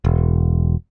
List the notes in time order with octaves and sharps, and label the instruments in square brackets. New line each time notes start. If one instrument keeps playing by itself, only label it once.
[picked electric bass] E1